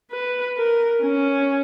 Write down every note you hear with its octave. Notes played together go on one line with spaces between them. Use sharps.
B4
A#4
C#4